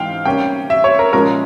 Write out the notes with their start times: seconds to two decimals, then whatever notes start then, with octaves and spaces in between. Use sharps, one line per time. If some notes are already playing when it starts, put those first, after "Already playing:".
Already playing: G#2 E3 G#3 C4 F5 G5
0.25 C3 G3 A#3 C#4 G5
0.70 E5
0.84 C#5
0.99 A#4
1.13 A#2 F3 G#3 C#4 A#4